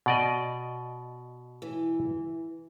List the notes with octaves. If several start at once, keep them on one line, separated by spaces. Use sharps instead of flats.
B2 D5 D#5
E3